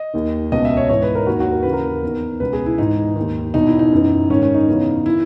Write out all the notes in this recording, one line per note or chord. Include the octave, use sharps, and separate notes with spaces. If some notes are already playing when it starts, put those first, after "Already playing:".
Already playing: D#5
D#2 D#3
C#2 B2 D#5
E5
C#5
G#2 E3 C#5
B4
A#4
D#2 D#3 F#4
F#4
A#4
D#2 C#3 E3 B4
A#4
E2 D#3
C#2 B2 B4
G#4
E4
G#2 E3 D#4
D#2 D#3
E2 B2 D#4
E4
D#4
F#2 E3
G#2 D#3 C#4
C#4
D#4
E2 C#3 E3
D#3 E4